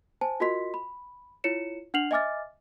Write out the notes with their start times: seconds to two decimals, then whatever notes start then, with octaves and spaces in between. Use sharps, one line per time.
0.21 C5 G#5 A5
0.40 F4 F#4 A#4 D#5 C6 B6
0.74 B5
1.44 E4 F4 C#5 C#7 E7
1.94 D4 F#5 F6 C7 F7 F#7
2.11 D#5 E5 G#5 D6 F6 A6